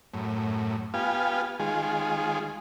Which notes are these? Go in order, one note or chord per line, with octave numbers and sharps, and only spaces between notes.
F#2 A2
B3 F4 G4 F5 G#5
D#3 G#3 F4 G#4